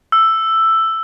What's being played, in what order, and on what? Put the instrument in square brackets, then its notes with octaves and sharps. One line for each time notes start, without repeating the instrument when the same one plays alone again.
[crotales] E6